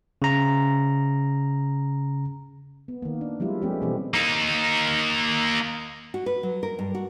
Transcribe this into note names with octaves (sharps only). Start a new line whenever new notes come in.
C#3 A#5
B3
D#3 A#3
D4
F3 G3 G#3 E4 F4
F3 G#3 A3 B3 C#4 G4
B2 E3 G3 A3 C4 D4
A#3 D#4
F#4
B4
F#3
A#4
G2
F#4